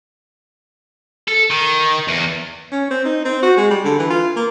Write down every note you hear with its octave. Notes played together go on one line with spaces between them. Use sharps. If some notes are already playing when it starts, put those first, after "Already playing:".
A4
D#3
E2
C#4
C4
D#4
C4
F#4
G#3
G3
D3
E3
F4
A#3